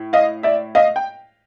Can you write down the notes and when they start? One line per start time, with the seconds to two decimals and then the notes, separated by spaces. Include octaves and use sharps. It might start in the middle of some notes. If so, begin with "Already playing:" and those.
Already playing: A2
0.13 D#5 F5
0.43 D5 E5
0.75 D#5 F5
0.96 G5